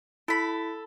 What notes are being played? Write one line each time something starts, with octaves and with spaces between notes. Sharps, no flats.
E4 A4 B5